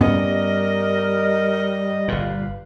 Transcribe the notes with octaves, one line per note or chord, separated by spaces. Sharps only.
G2 G3 B3 C#4 A#4 D#5
G1 A#2 G4 B4 F5